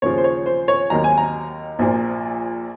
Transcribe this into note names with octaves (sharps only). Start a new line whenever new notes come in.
D#2 C#3 F3 C#5
C5
C#5
C5
C#5
D#2 D#3 F#3 A#5
G#5
A#5
A#1 A#2 F3